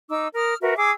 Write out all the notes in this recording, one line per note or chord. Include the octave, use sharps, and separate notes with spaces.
D#4 D6 E6
A#4 D#6 F6
F#4 A#4 B4 E5
G#4 D6 E6 G#6